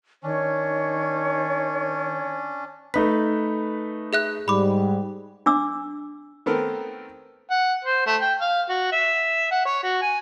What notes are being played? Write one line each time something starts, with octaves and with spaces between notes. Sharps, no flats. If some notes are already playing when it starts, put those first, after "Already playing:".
D#3 C#4 D4 C#5
A3 D#4 B4 B6
G#4 E5 F#6
G#2 G3 B5 D6
D4 D6 E6
D#3 A3 B3 C4 A4 A#4
F#5
C5
A3
G5
F5
F#4
E5
F#5
C#5
F#4
G#5